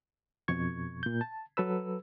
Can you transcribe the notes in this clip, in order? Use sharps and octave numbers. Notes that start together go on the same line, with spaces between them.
F2 B2 C#6 G#6
A#2 G6
A5
F#3 A4 B4 E6